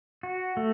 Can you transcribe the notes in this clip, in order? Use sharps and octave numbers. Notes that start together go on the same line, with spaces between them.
F#4
A3